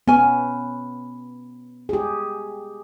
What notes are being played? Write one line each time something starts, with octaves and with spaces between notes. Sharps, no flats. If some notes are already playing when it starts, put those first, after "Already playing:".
B3 C#4 G#5
G4 G#4